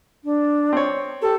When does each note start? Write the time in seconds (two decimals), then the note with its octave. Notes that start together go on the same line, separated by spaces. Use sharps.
0.24 D4
0.73 C4 C#5
1.22 G4 A4